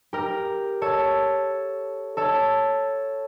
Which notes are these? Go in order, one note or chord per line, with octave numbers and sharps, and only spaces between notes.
G4 A#4
A4 C#5
A4 C#5